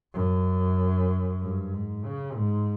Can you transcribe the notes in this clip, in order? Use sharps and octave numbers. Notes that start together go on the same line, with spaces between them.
F#2
G2
G#2
C#3
G#2